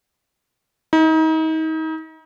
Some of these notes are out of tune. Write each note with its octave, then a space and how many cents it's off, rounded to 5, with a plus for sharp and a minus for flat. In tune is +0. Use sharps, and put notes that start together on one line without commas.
D#4 +35